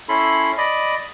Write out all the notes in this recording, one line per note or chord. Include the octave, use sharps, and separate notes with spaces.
C#4 E4 A4 B5 C6
D5 D#5 B5